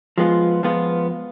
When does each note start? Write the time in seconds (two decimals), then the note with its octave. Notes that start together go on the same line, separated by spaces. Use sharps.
0.18 F3 G#3 B3 F4
0.63 F3 G#3 B3 F4